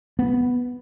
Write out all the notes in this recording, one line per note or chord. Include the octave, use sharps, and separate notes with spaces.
B3